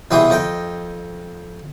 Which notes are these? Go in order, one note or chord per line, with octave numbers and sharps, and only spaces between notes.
C2 B2 E3 G#4 G5 D#6
F2 D#5 G5